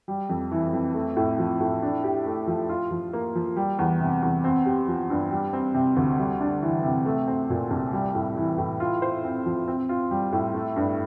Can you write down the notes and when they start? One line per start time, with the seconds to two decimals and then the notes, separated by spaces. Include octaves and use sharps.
0.08 G3
0.29 F2
0.51 E3
0.73 F2
0.94 A3
1.17 A2
1.39 F3
1.61 A2
1.83 D4
2.04 G4
2.26 A3
2.47 F3
2.69 F4
2.91 F3
3.13 A#3
3.35 F3
3.56 G3
3.79 E2
4.00 C3
4.22 E2
4.44 C4
4.66 G4
4.88 F3
5.10 G2
5.31 G3
5.53 C4
5.74 C3
5.97 D2
6.18 G3
6.41 D4
6.62 E3
6.84 C3
7.06 A3
7.27 C4
7.50 A#2
7.71 C2
7.93 G3
8.15 A2
8.36 E3
8.58 A2
8.80 F4
9.02 C5
9.24 C4
9.46 F3
9.68 C4
9.89 F4
10.11 G3
10.33 A2
10.54 A3
10.76 G2